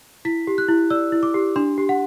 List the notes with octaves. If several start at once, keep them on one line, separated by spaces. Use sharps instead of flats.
E4 B6
G4
F#6
E4
D5 E6
E4
D6
G4
D4 C6
G4
F#5